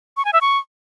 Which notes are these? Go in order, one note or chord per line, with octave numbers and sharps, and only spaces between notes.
C#6
G#5
E5
C#6